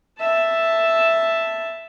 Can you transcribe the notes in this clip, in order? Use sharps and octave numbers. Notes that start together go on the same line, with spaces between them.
E5 A5